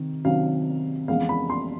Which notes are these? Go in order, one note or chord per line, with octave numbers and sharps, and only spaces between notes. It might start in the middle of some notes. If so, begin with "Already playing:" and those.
Already playing: C3 D#3
C3 D#3 F#3 F5
F2 C#3 E3 G#3 B3 F5
B5
C6